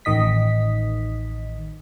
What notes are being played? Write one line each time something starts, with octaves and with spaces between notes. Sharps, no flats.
A1 D#3 D#5 B6